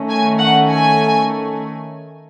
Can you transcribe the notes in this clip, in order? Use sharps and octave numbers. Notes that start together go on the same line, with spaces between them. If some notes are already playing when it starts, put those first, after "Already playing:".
Already playing: D#3 A3 C#4
G#5
F#5
G#5